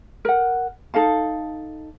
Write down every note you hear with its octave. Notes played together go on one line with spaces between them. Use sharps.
A#4 F#5
D#4 A4 F5 A5